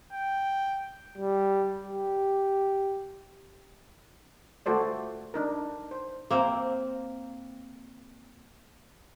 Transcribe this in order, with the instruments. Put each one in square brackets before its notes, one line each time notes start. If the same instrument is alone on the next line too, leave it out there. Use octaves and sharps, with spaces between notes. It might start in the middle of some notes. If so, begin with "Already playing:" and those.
[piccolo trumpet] G5
[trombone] G3
G4
[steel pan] A3 F4 F#4 A4 C5 D5
D4 D#4 A#4
C5
[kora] A#3 C4